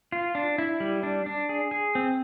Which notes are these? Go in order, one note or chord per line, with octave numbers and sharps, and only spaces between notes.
F4
D4
E4
G3
D4
D4
G#4
G#4
C4